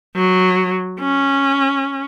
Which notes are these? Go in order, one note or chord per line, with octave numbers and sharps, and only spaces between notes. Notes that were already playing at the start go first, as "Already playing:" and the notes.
F#3
C#4